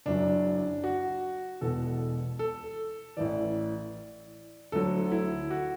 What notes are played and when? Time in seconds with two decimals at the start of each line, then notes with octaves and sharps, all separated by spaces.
0.06 F#1 F#2 F#3 D4
0.84 F#4
1.61 E1 E2 B2 A4
2.39 A4
3.17 A1 A2 E3 D5
4.72 D2 D3 F#3 A4
5.12 E4
5.50 F#4